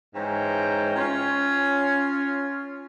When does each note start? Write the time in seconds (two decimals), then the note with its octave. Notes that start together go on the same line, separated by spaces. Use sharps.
0.15 G#2 E3 G#3 C#4 G5 A#5
0.96 C#4 F4